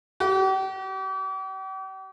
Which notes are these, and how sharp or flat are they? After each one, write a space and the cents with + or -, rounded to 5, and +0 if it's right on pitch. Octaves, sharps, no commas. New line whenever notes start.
G4 -45